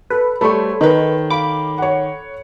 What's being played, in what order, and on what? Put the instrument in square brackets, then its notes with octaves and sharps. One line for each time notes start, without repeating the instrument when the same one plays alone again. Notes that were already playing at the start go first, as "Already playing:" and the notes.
[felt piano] A4 [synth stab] B4
[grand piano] G3 A3 [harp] A4 C5 C#5 [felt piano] B5 C#6
[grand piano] D#3 [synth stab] D#4 A#4 B4
[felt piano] F5 [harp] B5 [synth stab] D6
[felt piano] C#5 F#5